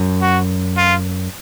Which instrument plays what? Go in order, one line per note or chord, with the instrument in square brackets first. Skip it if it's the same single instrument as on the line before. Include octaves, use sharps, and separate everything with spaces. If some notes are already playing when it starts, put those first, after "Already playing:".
Already playing: [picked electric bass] F#2
[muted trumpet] F#4
F4